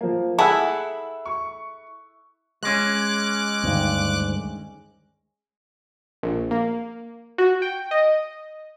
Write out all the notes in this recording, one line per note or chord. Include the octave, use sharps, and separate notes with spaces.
F3 A#3
E4 G#4 A4 F#5 E6 F#6
C#6
G#3 C#4 D6 F#6
D2 G2 D#3
A#1
A#3
F#4
G5
D#5